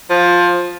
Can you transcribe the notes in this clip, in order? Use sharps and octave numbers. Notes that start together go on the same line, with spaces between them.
F3